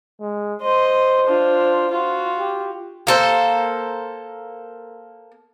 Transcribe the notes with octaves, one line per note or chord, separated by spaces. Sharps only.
G#3
C5 D#5 C6
D4 F4
F4 F#4
G4
A#3 A4 C5